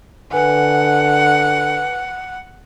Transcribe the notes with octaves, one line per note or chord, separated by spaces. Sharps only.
D3 B4 F#5 G#5